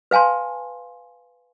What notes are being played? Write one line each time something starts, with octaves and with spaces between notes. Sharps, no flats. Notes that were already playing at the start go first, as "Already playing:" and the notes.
B4 F5 G#5 A5 C6